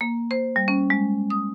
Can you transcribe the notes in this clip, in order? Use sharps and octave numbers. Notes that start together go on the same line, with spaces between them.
A#3
C5
G3
C#4
G#3
D#6